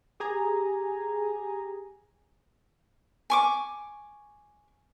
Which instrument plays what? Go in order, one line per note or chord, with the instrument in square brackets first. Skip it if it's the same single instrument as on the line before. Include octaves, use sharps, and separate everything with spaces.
[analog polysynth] G4 G#4 G#5 A#5
[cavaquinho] G#5 C#6 D6